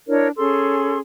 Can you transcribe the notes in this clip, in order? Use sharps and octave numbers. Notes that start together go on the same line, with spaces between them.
D4 E4 A#4 C#5
C#4 G#4 A4 C6